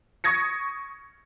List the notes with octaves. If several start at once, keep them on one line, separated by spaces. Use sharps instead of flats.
C#6 D#6 G#6 A#6 C#7